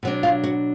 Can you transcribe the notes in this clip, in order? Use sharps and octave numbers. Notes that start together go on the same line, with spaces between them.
B2 F#3 D4
F4 F5
F#4 F#5